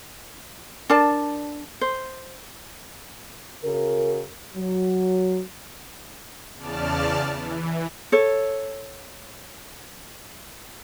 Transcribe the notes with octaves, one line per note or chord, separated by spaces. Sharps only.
D4 A#4 D5 A5
C5
C#3 F#4 A#4
F#3
E2 C#3 D5 A5 F6
E3
A4 C#5